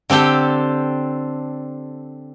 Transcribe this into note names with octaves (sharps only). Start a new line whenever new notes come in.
D3 C4 G4 A4 G5